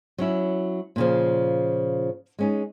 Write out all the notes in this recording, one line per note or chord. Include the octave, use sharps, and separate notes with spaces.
F#3 C#4 E4
A#2 C#3 F3
G#3 C#4 D#4